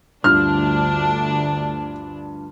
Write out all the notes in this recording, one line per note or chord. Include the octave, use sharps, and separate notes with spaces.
D2 G2 D4 F4 F6